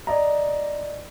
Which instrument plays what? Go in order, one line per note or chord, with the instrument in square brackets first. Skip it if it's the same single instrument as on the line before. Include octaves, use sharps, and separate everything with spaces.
[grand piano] D5 D#5 A#5